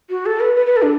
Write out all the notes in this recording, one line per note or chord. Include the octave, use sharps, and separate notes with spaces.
F#4
A4
B4
B4
B4
A4
D4